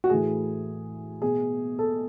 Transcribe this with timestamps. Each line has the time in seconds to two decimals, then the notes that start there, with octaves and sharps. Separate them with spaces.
0.04 F#4
0.10 A2 E3 G#4
1.22 B2 G#4
1.79 A4